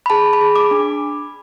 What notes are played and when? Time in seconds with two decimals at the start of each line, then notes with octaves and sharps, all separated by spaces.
0.06 B5
0.10 G#4 A5
0.33 B5
0.41 G#4
0.56 D6
0.71 D4